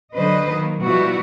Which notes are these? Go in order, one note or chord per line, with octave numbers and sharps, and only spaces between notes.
D3 F#3 G3 B4 C5 D#5
D#3 A#3
B2 F3 G3 B3 E4 F#4